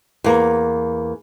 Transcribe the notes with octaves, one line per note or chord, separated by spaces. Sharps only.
E2 A#3